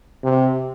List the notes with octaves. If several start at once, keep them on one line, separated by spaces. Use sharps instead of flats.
C3